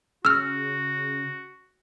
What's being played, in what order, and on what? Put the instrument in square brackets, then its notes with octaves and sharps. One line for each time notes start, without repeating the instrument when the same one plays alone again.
[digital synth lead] C#3 [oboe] F#4 [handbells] E6 F6